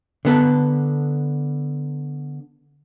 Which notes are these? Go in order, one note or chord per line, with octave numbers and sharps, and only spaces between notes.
D3 B3 A4